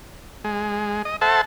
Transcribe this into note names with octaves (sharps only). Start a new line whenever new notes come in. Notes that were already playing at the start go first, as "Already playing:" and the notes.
G#3
D#5
A4 C5 E5 F#5 A5